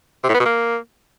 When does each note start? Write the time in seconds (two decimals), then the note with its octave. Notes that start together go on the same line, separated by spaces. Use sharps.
0.23 C3
0.29 A2
0.34 B3
0.40 B2
0.45 A#3